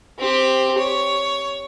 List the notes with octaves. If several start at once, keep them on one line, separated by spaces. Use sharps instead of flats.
C4 G4
C#5